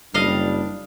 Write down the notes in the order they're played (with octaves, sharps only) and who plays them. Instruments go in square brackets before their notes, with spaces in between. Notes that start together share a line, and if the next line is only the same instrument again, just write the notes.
[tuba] F#1 [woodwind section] G3 D4 [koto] D#5 F5